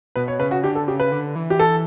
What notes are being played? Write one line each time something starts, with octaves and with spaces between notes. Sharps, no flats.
B2 B4
C#5
C#3 B4
F#4
D3 G4
A4
C#3 G4
B4
D3
E3
G4
A4